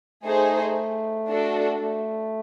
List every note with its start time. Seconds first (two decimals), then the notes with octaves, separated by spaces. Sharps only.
0.23 A3 D#4 G#4 C5
1.28 D4 F#4 A4
1.80 A3